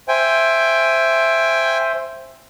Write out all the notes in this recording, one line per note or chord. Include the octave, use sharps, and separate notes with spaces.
C5 E5 G5 G#5